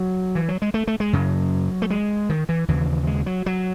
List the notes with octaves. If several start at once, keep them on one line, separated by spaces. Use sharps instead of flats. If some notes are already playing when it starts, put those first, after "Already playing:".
Already playing: F#3
E3
F#3
G#3
A3
A3
G#3
F#2 C#3 F#3
A3
G#3
D#3
E3
D#2 C#3 E3
G#3
F#3
F#3